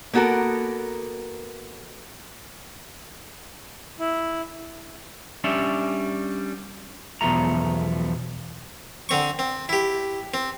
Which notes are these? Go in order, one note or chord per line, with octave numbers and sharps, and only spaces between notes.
A#3 B3 F#4 A4 A#4
E4
G3 C#4 D4 C#5 D5 E5
B1 E2 B2 F3 A3 A#5
D3 C4 C#6
C4
E4 G4
C4